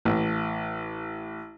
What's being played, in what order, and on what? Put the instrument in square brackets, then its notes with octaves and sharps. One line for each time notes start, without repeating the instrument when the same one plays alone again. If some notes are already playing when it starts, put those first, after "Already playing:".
[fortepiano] A1